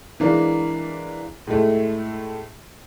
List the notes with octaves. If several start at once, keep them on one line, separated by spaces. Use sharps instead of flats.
E3 G#3 A#3 D4
A2 G#3 A3